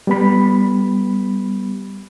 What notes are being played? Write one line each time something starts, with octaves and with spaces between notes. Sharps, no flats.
G3 B3 B5